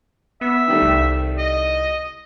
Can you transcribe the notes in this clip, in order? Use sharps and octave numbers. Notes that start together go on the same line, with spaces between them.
B3 E5
D#3 G3 A3
C2
D#5